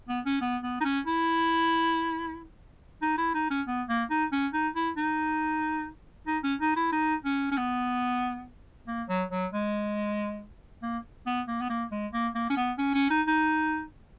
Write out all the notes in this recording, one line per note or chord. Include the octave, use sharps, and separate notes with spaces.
B3
C#4
B3
B3
D#4
C#4
E4
D#4
E4
D#4
C#4
B3
A#3
D#4
C#4
D#4
E4
D#4
D#4
C#4
D#4
E4
D#4
C#4
C#4
B3
A#3
F#3
F#3
G#3
A#3
B3
A#3
B3
A#3
G#3
A#3
A#3
C#4
B3
C#4
C#4
D#4
D#4